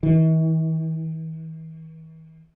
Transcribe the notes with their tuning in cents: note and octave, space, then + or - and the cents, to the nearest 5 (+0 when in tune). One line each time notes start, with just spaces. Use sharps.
E3 -45